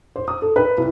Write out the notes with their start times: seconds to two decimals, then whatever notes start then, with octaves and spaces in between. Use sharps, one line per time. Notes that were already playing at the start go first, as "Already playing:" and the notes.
0.16 C5
0.28 D#6
0.42 A4
0.56 B4
0.78 C2